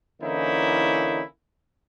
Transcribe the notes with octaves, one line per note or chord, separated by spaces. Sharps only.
D3 E3 A#3 C#4 D#4 E4